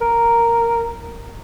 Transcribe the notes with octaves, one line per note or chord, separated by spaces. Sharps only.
A#4